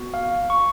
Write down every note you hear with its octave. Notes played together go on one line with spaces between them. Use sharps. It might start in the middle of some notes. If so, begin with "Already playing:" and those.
Already playing: B3 F#4
F5
C#6